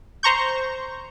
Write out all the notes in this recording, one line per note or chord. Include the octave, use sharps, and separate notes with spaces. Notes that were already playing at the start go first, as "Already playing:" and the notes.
C5 A#5 C#6 G6